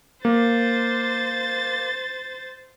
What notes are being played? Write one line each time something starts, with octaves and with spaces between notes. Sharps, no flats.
A#3 C5 A6